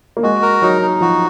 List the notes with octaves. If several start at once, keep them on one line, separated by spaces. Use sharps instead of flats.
A#3
G#3 F#4
A#4
F#3 D#4
D#4
F3 F#4